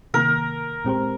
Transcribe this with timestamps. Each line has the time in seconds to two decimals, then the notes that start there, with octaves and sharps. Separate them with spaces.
0.14 C3 D#3 A#3 A#4
0.85 A#2 G#3 C4 G4 C5